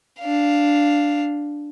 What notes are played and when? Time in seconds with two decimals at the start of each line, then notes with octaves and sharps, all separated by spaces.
0.21 D4 F5